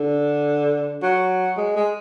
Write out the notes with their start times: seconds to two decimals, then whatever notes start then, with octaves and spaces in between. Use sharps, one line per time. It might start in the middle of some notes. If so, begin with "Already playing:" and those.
Already playing: D3
1.02 F#3
1.57 G#3
1.76 G#3